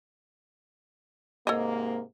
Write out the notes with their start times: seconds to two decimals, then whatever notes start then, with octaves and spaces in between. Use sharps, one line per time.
1.47 G#2 C3 A#3 A4 C#5 D#5